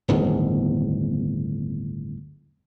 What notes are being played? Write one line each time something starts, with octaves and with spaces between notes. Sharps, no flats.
D1 G1 E2 D#3